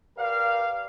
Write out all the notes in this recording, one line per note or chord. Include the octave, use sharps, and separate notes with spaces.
G4 A#4 B4 D5 F5